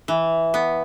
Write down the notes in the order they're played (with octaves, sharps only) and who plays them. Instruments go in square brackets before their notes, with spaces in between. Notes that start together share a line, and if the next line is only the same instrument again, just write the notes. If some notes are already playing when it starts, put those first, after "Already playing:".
[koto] E3
B3